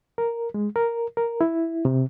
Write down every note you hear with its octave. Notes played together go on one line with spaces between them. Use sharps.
A#4
G#3
A#4
A#4
E4
C3